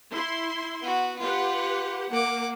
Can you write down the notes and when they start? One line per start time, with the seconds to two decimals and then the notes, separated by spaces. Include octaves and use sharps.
0.11 E4 C6
0.82 B3 F#4
1.19 F4 G4 B4 F#5
2.10 A#3 F#5 D6